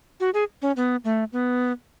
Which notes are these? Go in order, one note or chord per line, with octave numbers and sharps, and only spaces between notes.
F#4
G#4
C#4
B3
A3
B3